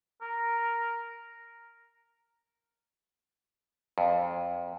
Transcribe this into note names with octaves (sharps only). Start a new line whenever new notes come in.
A#4
F2